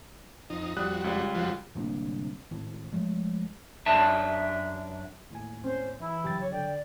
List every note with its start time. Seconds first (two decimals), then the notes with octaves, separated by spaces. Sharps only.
0.50 F2 D#4
0.77 F2 G3 F#4 D#6 F#6
1.04 C#2 G3
1.35 F2 F3 F#4
1.75 D1 C2 A#3 D4
2.51 G#1 A2
2.93 F3 G#3 A3
3.86 F#2 D4 E5 A5
5.31 D#2 A2 G#5
5.64 C4 C#4 C5
6.00 E3 E4
6.24 G2 C#3 F#3 G4 G5 A6
6.40 C#5
6.52 D3 D5 G5